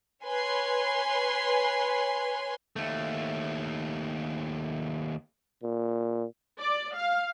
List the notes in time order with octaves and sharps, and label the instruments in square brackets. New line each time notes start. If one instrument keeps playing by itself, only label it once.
[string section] B4 C#5 G#5 C6
[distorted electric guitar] D#2 A3
[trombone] A#2
[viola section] D5
F5